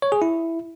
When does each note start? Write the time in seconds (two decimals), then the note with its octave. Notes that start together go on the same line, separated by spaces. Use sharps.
0.02 C#5
0.12 G#4
0.22 E4